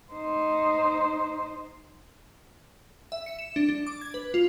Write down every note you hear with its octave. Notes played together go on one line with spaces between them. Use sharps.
D#4 C5
E5
C#7
E7
D4
D4
D6
G#6
B4
F4